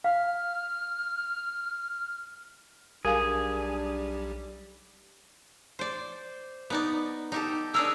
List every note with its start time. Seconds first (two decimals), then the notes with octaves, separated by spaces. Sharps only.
0.04 F5 F6
3.05 B1 G3 D4 G4 G#4 A#4 F5 G#5
5.79 C5 D5
6.70 B3 D#4 D5
7.32 D#4 G4 A4
7.74 D4 G#4 A#4 E6